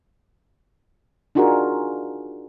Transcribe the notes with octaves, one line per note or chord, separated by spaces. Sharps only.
D4 D#4 F4 F#4 G#4 A#4